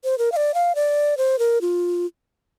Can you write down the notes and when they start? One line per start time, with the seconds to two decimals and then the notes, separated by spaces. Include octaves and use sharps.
0.04 C5
0.18 A#4
0.32 F5
0.36 D5
0.54 F5
0.75 D5
1.17 C5
1.39 A#4
1.61 F4